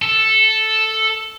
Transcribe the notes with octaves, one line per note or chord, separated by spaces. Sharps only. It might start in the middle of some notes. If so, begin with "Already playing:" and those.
A4